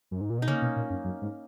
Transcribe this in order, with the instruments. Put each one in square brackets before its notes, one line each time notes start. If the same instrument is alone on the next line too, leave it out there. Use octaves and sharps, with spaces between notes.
[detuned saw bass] F#2
G#2
A#2
[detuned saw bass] B2 [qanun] D#4
[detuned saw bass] C#3 [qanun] A#3 C#4
[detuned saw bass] B2
A#2
F#2
F#2
G#2